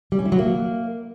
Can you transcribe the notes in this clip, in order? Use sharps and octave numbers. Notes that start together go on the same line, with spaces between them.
G3
C#4
E4
F#3
A#3